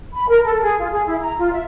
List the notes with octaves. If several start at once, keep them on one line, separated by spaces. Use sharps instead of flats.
B5
A#4
A4
G#4
F4
G#4
E4
A#5
F4
E5